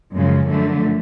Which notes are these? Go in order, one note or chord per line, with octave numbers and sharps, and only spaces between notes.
F#2 C#3 F3 G#3
F#2 D3 F3 A3